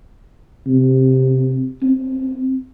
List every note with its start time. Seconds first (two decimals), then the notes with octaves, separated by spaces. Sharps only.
0.67 C3
1.82 C4